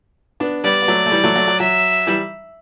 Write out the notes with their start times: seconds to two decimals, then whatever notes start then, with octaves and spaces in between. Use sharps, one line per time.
0.40 B3 D4
0.64 G3 B3 D5
0.82 B3
0.88 F#3 A3
1.06 A3
1.12 E3 G3
1.24 F#3 A3
1.36 F#3 A3
1.48 F#3
1.60 F#3 E5
2.07 E3 G3